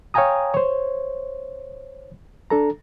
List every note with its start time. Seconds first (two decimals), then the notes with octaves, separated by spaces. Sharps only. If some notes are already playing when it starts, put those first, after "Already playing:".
0.14 C#5 F5 G5 G#5 A#5 D#6
0.54 C5 C#5
2.50 D4 A4 A#5